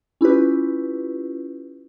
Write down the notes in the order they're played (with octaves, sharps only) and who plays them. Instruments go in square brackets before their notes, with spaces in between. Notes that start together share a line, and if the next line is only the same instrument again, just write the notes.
[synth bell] C#4 E4 F4 G4 B4